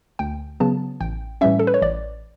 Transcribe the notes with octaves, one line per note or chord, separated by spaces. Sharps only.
D2 G5
C#3 F#3 B3 A5
A1 G5
A2 E3 G3 C#4 E5
A4
B4
C#5
A1 D5